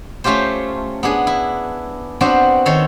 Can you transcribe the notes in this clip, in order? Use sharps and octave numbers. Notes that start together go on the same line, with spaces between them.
A3 C#4 F4 G4 C5
B3 D4 G#4
E4
B3 C4 D4 F#4 C5
D#3 A4 C#5 C6